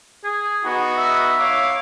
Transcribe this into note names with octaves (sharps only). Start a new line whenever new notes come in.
G#4
B3 D#4 F#4
E5
C#5 F5 D6